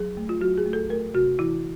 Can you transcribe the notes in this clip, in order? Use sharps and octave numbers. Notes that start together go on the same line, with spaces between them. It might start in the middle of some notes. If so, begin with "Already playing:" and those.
Already playing: F#3 G#4
A3
F4
F#3 F#4
G#4
A3
A4
A3 A#4
C3 F#4
E3 E4